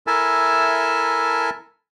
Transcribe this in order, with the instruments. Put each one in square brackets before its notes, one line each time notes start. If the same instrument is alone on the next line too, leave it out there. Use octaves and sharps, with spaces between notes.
[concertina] E4 A4 A#4 E5 G#5 A5